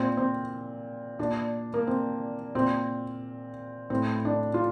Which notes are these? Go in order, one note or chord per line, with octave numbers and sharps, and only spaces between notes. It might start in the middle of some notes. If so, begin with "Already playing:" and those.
Already playing: A#2 C4
C4
A#2 D4
A#3
C4
A#2 C4
A2 C4
D4
F4